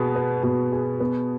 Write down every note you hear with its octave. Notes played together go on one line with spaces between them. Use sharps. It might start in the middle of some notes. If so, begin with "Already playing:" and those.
Already playing: B2 B3 G#4
B4
B2
G#4
B3